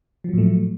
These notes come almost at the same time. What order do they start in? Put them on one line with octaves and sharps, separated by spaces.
F3 F#3 A2 A3